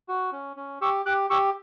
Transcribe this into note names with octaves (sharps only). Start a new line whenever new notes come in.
F#4
C#4
C#4
G4 C#6 E6
G4 D6 F#6
G4 C#6 E6